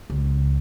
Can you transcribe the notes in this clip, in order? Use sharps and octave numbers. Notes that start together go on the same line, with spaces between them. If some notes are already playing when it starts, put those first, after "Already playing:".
C#2